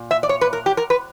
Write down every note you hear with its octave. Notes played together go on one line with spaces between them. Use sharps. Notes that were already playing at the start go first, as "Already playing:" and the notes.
Already playing: A#2
E5
D5
C#5
B4
A#4
G4
A#4
B4